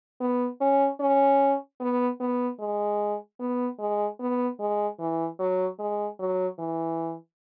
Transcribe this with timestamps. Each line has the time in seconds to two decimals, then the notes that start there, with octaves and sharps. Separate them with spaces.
0.20 B3
0.60 C#4
1.00 C#4
1.80 B3
2.21 B3
2.60 G#3
3.40 B3
3.79 G#3
4.20 B3
4.59 G#3
4.99 E3
5.39 F#3
5.79 G#3
6.19 F#3
6.58 E3